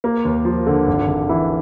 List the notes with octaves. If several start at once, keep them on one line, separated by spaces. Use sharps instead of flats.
A#3
D#2
F3
D3
G#1
G#1
E3